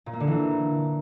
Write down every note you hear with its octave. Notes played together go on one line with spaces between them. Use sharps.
A#2
A#3
D3
E3